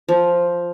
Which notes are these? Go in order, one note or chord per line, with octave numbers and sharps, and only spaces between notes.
F3